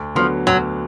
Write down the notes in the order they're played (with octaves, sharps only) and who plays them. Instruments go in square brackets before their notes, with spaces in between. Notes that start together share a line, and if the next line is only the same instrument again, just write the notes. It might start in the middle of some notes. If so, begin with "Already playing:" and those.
Already playing: [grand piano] D2
[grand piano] D3 F#3 B3 [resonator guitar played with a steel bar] F3
[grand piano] D2 [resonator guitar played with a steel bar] F#3